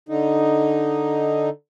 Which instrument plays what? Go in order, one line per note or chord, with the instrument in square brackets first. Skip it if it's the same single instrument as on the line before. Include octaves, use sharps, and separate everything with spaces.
[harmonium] D3 D#4